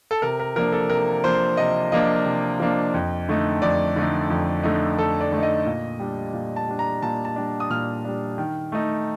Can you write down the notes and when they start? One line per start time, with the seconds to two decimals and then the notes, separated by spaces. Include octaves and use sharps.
0.11 A4
0.22 C3 A#4
0.40 A#4
0.56 F3 A#3 D4 A#4
0.72 A4
0.89 C3 A#4
1.24 F3 A#3 D4 C5
1.57 C3 D#5
1.92 F3 A#3 D4 D#5
2.25 C3
2.60 F3 A#3 D4
2.94 F2
3.29 D3 A3 D#4
3.62 F2 D5
3.96 D3 A3 D#4
4.30 F2
4.63 D3 A3 D#4
4.97 F2 A4
5.21 D5
5.32 D3 A3 D#4
5.43 D#5
5.66 A#2
5.99 G3 D4
6.33 A#2
6.56 A5
6.68 G3 D4
6.79 A#5
7.02 A#2 A5
7.25 A5
7.36 G3 D4
7.60 D#6
7.70 A#2 F6
8.05 G3 D4
8.38 D#3
8.72 A3 D#4